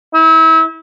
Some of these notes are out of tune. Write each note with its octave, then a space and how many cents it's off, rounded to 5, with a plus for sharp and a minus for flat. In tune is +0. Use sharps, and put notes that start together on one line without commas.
E4 -35